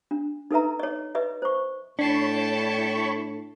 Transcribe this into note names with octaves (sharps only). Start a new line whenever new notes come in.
D4
D#4 A4 B4 E5 A#5
C#5 D#5
B4 D#5 E5
C5 C#6
A2 D4 C#5 G5 A5 B5 C#6 C7